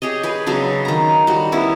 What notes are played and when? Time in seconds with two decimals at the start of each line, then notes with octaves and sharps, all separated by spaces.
0.02 G4 G#4 C#5 D#5
0.23 G#4 B4
0.47 C#3 F#3 B3 D4
0.85 D#3 A#5
1.27 G3 F#4
1.52 B3 C#4 E4